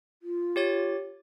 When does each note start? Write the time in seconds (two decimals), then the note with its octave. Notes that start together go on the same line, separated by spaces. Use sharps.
0.22 F4
0.56 G4 C#5 A6